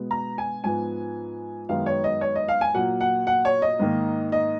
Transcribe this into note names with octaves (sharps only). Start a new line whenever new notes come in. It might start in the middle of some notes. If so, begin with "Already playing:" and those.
Already playing: B2 G#3 B3
A#5
G#5
G#2 F3 B3 G#5
F#2 D#3 G#3 B3 F5
C#5
D#5
C#5
D#5
F5
G#5
A#2 F#3 A#3 F#5
F#5
F#5
C#5
D#5
G#2 D#3 A#3
D#5